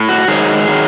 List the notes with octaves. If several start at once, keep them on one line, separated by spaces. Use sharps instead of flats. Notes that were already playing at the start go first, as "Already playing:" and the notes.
Already playing: A2
F#4
G#2 D#3 F#3 G#4
D#3 F#3